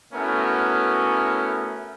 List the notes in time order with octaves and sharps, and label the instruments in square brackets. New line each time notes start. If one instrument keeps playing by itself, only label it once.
[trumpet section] A3 B3 C#4 E4 F#4 A#4